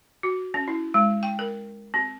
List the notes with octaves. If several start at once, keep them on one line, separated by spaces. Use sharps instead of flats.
F#4
C#4
E4
G#3
G5
A#4
C4